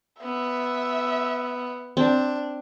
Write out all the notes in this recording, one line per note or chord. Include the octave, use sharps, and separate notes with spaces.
B3 E5
C4 D4